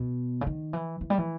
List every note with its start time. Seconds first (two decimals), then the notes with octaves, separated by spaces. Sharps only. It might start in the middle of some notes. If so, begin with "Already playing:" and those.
Already playing: B2
0.41 C#3
0.47 D#3
0.73 E3
1.01 E3
1.10 G3
1.18 E3